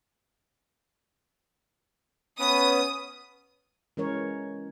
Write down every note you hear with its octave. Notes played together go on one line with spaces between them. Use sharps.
B3 C#4 B4 D#6
E3 G#3 C#4 A#4 C#5